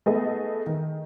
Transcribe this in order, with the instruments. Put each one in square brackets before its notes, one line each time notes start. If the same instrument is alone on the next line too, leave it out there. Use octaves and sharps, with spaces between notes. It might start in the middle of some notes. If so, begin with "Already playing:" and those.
[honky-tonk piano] A3 B3 G#4 D#5
D#3